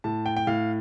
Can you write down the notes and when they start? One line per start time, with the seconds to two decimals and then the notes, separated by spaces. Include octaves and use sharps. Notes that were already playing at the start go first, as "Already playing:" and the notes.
0.04 A2 A5
0.26 G5
0.36 G5
0.47 A2 F5